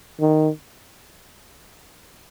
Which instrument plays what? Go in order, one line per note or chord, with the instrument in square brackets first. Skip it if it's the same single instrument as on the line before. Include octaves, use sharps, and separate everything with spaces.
[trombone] D#3